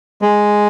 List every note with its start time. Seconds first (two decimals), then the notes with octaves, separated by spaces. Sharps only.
0.22 G#3